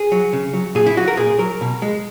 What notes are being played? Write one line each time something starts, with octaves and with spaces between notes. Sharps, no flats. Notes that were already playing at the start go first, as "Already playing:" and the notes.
Already playing: G#4
F#3
C#3
F#3
A#2 G#4
E4
F#3 F#4
A#4
A#2 G#4
F#3 A#4
B2
G#3